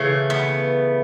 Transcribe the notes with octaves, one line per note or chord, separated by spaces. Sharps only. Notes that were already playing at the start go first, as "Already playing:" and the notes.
Already playing: C#3 E3 A3
B3